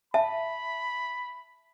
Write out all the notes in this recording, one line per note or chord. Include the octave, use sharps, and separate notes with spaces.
E5 A5 B5